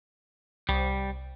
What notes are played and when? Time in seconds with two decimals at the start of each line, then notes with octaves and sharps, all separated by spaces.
0.69 C2 G3